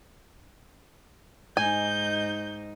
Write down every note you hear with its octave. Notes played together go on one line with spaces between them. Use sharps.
G#2 D#4 G#5 G6